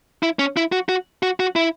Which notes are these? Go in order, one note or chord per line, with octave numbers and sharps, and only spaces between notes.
E4
C#4
E4
F#4
F#4
F#4
F#4
E4